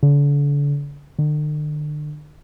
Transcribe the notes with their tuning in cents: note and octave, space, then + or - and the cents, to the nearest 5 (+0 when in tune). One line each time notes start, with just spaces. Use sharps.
D3 -40
D3 +40